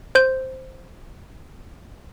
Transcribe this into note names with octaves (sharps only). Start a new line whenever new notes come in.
C5 G6